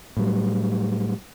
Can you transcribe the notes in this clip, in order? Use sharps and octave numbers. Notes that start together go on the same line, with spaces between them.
A2 F#3 G3